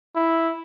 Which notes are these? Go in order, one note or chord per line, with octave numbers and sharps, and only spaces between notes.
E4